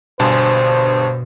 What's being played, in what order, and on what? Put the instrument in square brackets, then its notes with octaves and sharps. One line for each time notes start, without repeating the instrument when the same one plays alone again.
[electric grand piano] G1 G2 A5 [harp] B2 G#5 C6 [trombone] C5